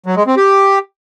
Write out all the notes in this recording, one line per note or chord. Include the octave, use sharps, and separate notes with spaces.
F#3
G#3
C4
G4